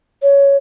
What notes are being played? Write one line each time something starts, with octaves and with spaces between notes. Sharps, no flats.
C#5